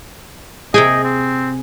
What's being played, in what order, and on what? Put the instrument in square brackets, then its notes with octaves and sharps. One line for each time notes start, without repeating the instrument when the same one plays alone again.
[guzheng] C3 G5 G#5 [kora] G#4 [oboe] D#5
[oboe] C4